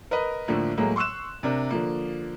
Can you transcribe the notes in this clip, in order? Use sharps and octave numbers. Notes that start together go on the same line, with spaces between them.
A#4 B4 D#5
A2 D3 F3 A3 A#3
A2 F#3 G#3 A#3
C6 C#6 E6 F#6 E7
C3 D4 A#4
D3 F3 A#3